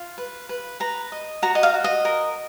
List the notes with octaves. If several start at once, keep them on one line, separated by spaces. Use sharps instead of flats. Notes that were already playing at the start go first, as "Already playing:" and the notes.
Already playing: F4
B4
B4
B4 A#5
D#5
F#4 A#5
D#5
F5
F#4
D#5
A#4